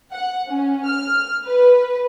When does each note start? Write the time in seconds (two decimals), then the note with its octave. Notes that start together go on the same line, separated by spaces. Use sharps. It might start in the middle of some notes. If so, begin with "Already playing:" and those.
0.12 F#5
0.50 C#4
0.86 F6
1.46 B4